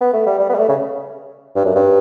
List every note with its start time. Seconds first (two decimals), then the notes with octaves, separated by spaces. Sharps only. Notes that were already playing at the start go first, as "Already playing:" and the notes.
0.01 B3
0.13 A3
0.26 G3
0.39 G3
0.49 B3
0.54 G3
0.58 A3
0.69 C#3
1.56 G2
1.65 F#2
1.75 G2